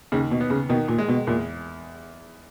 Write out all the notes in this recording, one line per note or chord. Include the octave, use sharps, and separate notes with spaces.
D#2 C#3
B2
B3
C#3
B2 D#3
A#2
G#3
B2
E2 A#2